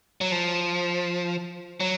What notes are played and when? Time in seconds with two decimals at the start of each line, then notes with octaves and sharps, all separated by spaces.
0.21 F#3
0.32 F3
1.80 F#3